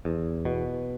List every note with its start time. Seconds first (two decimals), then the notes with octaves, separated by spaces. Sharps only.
0.05 E2
0.45 B2